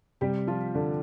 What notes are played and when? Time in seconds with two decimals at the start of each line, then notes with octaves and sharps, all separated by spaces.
0.21 C3 G3 G4
0.47 F3 F4
0.75 D3 D4